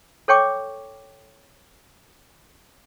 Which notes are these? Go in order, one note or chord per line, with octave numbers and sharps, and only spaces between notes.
A4 C#5 G5 C#6 D6